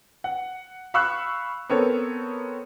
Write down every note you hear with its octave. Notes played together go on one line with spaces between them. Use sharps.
F#5
F5 B5 C#6 E6 F#6
B3 C4 A4 A#4 C#5